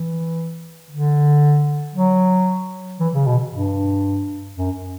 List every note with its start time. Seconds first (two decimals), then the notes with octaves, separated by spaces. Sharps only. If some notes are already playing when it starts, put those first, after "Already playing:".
Already playing: E3
0.90 D3
1.95 F#3
3.00 E3
3.14 C#3
3.26 B2
3.52 G2
4.57 F#2